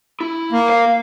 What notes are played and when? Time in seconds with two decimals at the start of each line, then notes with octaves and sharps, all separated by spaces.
0.21 E4
0.52 A#3
0.70 F5